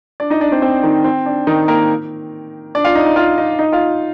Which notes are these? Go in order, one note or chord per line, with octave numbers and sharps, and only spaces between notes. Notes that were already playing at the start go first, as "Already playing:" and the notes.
D4 D5
D#4 D#5
D4 D5
C4 C5
C4 C5
D#3 D#4
C4
D4
D#3 D#4
A#3 A#4
D4 D5
F4 F5
D#4 D#5
D#4 D#5
F4 F5
D#4 D#5
D#4 D#5
F4 F5